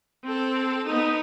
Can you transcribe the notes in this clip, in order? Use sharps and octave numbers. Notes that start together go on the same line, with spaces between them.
C4 A4
B3 D#4